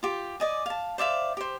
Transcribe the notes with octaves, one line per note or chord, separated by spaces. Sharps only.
F4 G4
D5 D#5 G#5
F5 A5
C5 D5 E5 F5
G4 C5